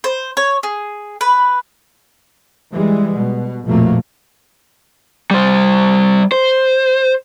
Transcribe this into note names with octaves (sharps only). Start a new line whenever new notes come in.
C5
C#5
G#4
B4
E3 G3 G#3
B2
A#1 F2 B2 A3 A#3
G3 C5
C5